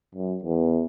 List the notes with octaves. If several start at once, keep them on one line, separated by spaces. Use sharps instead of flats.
F#2
E2